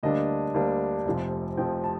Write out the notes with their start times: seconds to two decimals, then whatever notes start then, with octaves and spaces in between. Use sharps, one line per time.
0.03 D2 D3 G3 A#3 D4 D#5
0.54 D2 D3 G3 A#3 D4
1.06 F1 F2 C3 F3
1.57 F1 F2 C3 F3 G5
1.84 A5